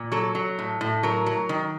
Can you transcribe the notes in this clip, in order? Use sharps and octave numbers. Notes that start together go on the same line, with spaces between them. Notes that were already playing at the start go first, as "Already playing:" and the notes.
Already playing: A#2
F#3 A4
F#3
A2
A2
F#3 A#4
F#3
D#3